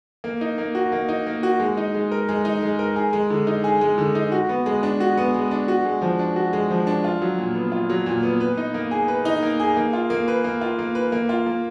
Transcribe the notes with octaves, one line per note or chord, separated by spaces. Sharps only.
A#3
D#4
A#3
F#4
A#3
D#4
A#3
F#4
G#3
D#4
G#3
A#4
G#3
D#4
G#3
A#4
G#4
G#3
D3
D#4
G#4
G#3
D3
D#4
F#4
B3
G#3
D4
F#4
B3
G#3
D4
F#4
G#3
F3
D4
F#4
G#3
F3
D4
F4
F#3
A#2
B3
F4
F#3
A#2
B3
B4
D#4
A#3
G#4
B4
D#4
A#3
G#4
A#3
F4
A#3
B4
A#3
F4
A#3
B4
A#3
F4
A#3